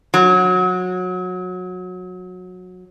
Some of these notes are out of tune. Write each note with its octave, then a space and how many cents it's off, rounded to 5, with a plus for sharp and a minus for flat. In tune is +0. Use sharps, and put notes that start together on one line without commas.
F#3 -20